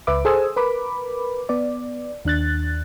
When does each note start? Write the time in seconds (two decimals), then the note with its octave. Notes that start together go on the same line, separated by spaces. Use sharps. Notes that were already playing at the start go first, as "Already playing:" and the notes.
0.07 C#2 B4 E5 D6
0.25 G#4 A4 C5 G#5 D#6 E6
0.56 A#4 B4 B5 D6
1.49 B3 D5
2.25 D#2 D4 F#6 A6